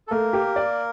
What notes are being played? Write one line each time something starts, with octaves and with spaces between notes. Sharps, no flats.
A4
A3 A#3 A#4
G4
D5